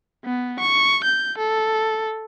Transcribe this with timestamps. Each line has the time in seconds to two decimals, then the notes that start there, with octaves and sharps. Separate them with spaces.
0.25 B3
0.60 C#6
1.04 G6
1.38 A4